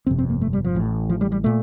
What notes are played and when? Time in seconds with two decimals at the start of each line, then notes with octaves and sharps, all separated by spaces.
0.06 G1 F2 C3 C4
0.18 C4
0.29 A#3
0.41 A3
0.53 G3
0.64 F3
0.75 A1 A2
1.10 F3
1.21 G3
1.32 G3
1.44 A#2 A3